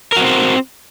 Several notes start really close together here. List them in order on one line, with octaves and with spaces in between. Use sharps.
A#4 F#4 C4 C5